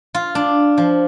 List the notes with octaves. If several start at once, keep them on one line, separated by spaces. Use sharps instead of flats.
F4
D4
F3